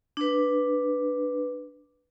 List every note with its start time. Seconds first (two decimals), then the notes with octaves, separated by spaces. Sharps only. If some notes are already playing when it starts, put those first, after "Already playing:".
0.17 D4 B4